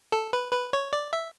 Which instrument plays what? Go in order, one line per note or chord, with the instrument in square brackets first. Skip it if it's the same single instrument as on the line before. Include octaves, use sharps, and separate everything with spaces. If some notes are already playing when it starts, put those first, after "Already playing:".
[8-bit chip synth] A4
B4
B4
C#5
D5
E5